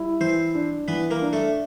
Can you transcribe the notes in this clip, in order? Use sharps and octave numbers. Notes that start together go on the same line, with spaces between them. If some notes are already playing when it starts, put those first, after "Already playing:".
Already playing: G3 E4
E3 C4 C5
D4
E3 B3 B4
A#3 A#4
D4
A3 A4